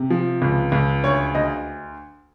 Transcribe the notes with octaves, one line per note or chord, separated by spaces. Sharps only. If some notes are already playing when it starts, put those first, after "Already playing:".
Already playing: C3
F3
C#2
C#2
D2 C#5
D2 D#5